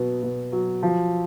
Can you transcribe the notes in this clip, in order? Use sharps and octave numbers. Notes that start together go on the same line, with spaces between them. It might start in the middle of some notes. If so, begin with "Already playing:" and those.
Already playing: B2 F#3 B3
B2
F#3
F3